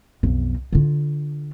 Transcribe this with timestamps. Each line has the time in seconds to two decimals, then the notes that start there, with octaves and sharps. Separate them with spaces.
0.23 B1 F2
0.72 D3 F4